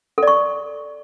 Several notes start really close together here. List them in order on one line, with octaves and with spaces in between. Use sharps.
A4 D5 C#6